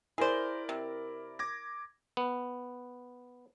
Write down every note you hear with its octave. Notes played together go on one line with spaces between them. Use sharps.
E4 G#4 A#4 C5 D5
C3
D6 G#6 A#6
B3